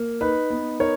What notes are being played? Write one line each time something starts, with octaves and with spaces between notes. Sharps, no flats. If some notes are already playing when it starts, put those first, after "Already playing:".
Already playing: A#3
D#4 B4
B3
D#4 A#4 C#5